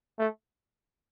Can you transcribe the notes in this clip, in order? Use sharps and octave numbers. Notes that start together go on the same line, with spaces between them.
A3